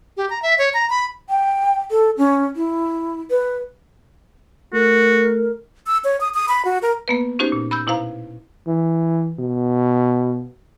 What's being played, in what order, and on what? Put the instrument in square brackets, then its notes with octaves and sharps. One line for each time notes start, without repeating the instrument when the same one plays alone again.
[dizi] G4
A#5
E5
C#5
A#5
B5
[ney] G5
A4
C#4
E4
B4
[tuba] A3 [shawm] F#4 [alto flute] A#4
[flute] E6
C#5
D#6
D#6
B5
F#4
A#4
[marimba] A#3 B3 B4
C#4 D#4 F#4 G4 C5
A#2
B5 E6 G6
B2 E4 C5 F5 A#5
[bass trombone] E3
B2